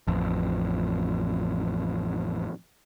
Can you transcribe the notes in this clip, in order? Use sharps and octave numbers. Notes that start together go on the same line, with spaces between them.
A1 F2